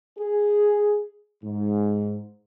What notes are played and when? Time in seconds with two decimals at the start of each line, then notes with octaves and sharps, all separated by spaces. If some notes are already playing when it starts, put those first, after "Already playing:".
0.18 G#4
1.43 G#2